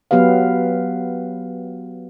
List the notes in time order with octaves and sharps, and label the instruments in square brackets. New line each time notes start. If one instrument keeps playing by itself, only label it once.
[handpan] F#3 B3 G4 B4 F5